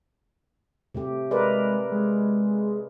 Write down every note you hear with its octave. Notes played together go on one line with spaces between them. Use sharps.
C3 A3 G4
G#3 A#4 B4 D5
G#3